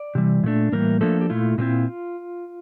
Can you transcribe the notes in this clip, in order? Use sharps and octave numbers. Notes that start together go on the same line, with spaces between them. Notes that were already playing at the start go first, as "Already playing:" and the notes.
Already playing: D5
C3 E3 G3
A#2 A3 D4
A2 E3 G3 A#3 A#4
F3 A3 A#3 D4 A4
G4
A#2 A3 E4 F4
A#2 A3 C4 E4 F4